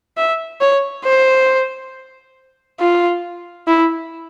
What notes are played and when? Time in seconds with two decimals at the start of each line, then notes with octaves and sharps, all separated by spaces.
0.17 E5
0.61 C#5
1.05 C5
2.80 F4
3.67 E4